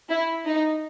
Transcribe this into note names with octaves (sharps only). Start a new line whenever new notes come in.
E4
D#4